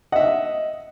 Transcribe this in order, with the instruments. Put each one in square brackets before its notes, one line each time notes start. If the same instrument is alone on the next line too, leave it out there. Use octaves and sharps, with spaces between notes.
[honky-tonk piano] D#5 [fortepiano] E5 F#5